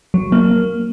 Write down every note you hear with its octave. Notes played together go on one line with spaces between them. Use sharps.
F#3
A#3